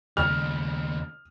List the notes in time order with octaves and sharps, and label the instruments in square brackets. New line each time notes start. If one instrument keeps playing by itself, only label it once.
[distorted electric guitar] D#2 C#3 [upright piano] F6